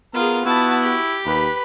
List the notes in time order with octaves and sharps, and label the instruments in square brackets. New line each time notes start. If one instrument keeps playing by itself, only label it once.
[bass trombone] B3 [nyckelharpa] F4 G#4 [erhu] A#4
[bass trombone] B3 [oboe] E4 [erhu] F#4 [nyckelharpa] A5
[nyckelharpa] G4
[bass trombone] D#2 [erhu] B4